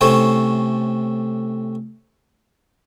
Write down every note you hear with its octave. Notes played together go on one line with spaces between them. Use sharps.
A2 C3 A3 C#4 C5 C#5